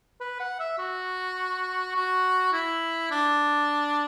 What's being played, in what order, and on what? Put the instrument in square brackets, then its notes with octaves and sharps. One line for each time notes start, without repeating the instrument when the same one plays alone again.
[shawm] B4
F#5
E5
F#4
F#4
E4
D4